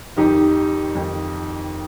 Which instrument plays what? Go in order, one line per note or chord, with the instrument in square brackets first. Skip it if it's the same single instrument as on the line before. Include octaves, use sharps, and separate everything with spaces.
[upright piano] F2 D#3 D#4 G4
F2 D#3